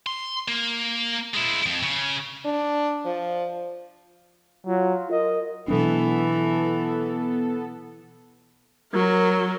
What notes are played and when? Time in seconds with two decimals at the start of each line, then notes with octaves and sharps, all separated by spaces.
0.07 C6
0.48 A#3
1.34 G#3 E4
1.66 F2
1.83 C#3
2.45 D4
3.05 F3
4.66 F#3 F4
5.11 A#4 D#5
5.68 B2 E3 F#3 B3 D4 A4
8.93 F#3 A#4